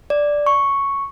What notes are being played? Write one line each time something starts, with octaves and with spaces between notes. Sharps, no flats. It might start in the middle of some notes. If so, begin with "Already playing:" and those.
D5
C#6